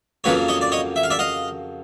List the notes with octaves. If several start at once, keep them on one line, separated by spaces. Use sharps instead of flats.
F2 C#3 F#3 A#3 B4 C#5
C#5 D#5
D5
C#5 D#5
E5
F5
D5 E5
D#5 F5